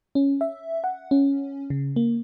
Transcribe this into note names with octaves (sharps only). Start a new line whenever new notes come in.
C#4
E5
F#5
C#4
C#3
A#3